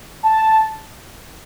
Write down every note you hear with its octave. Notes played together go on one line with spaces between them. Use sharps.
A5